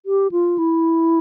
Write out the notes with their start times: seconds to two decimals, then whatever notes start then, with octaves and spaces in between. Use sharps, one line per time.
0.06 G4
0.31 F4
0.58 E4